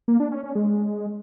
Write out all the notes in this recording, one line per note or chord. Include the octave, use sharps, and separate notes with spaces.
A#3
D4
C#4
C#4
G#3